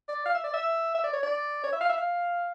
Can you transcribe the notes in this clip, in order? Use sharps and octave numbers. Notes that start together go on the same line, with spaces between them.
D5
F5
E5
D5
E5
E5
D5
C#5
D5
C#5
E5
F5
E5
F5